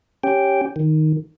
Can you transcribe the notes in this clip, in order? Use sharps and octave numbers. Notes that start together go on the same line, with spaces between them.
C#4 G4 G5
D#3